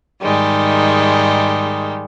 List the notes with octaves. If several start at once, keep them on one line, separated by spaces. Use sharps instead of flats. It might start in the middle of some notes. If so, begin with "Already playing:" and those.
G#2 D#3 G3 G#3